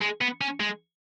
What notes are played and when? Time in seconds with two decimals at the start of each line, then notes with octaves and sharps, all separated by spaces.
0.01 G#3
0.21 B3
0.41 C#4
0.60 G#3